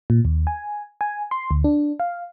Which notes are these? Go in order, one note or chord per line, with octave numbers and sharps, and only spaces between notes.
A#2
D#2
G#5
G#5
C6
D2
D4
F5